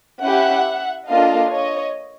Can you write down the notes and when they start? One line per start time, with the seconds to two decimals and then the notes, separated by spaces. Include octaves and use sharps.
0.21 C#4 E4 G4 E5 F#5
1.07 A#3 D4 F4 A4 D#5 F5
1.50 C#5 D#5